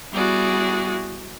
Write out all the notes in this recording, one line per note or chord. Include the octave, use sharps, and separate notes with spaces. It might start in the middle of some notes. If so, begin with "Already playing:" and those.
G3 B3 E4 F#4 G#4 D5